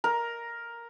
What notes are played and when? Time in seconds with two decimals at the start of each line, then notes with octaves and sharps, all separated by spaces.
0.04 A#4